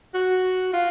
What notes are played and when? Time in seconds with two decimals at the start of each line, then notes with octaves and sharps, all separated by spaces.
0.14 F#4
0.73 F4